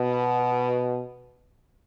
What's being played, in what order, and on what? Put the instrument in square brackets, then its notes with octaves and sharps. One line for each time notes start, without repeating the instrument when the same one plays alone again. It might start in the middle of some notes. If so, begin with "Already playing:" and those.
Already playing: [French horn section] B2